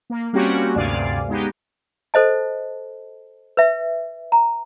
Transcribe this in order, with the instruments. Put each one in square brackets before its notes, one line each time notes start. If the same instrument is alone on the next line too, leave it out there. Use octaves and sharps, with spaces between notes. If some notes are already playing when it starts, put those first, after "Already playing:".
[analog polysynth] A#3
G3 A#3 C4 C#4 F#4 G4
D2 G2 C3 D5 F5 G#5
G#3 B3 D#4 G4
[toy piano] A4 C5 D#5 A5
B4 E5
A#5